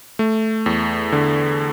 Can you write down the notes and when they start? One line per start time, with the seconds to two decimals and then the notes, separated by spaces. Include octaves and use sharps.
0.19 A3
0.66 E2
1.12 D3